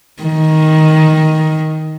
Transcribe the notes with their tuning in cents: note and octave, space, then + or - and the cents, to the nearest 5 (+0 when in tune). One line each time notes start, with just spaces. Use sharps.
D#3 +10